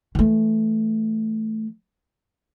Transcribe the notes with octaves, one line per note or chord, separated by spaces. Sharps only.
E3 A3